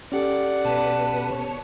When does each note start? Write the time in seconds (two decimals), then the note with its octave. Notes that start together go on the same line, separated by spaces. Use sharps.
0.12 C#4 G4 A4 D5 F#5
0.65 B2 B4 A5
1.31 C#5